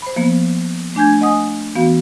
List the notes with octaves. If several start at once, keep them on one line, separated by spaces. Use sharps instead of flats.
C5 B5
F3 A#3 B3
A3 D4 G#5 G6 G#6
D#5 F#5 G#5 D#6
E3 B3 F#4 F5